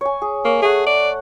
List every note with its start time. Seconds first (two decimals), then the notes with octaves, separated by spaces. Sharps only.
0.01 C#5 G#5
0.22 G#4
0.45 A#3 C#5
0.62 A3 G#4 F#5
0.86 D5